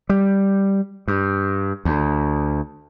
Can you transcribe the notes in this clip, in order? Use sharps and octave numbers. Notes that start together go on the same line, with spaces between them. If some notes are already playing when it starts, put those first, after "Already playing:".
G3
G2
D2